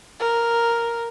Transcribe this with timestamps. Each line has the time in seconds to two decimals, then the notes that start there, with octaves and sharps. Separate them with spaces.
0.20 A#4